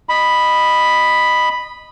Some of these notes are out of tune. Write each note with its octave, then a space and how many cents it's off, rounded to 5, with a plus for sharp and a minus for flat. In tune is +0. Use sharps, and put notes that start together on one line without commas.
D#5 -15 B5 +0